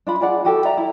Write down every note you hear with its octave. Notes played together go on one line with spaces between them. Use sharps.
D4 F4 B5
F4 G#4 D5 F#5
F#4 G4 A4
D5 E5 A#5
E4